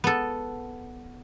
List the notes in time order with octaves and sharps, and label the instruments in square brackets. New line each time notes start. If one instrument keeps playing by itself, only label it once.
[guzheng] B3 A4